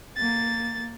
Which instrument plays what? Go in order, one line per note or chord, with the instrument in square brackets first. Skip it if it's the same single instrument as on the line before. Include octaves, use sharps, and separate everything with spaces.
[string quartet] A#3 A6